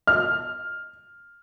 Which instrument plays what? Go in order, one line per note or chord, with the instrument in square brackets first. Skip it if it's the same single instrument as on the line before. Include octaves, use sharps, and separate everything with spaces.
[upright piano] F6